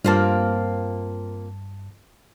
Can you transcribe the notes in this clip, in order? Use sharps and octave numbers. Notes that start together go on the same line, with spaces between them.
G2 A#3 C4 F4 A5